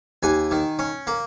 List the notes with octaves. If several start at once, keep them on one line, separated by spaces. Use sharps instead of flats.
D#2 G#5
D#3
C#4
A#3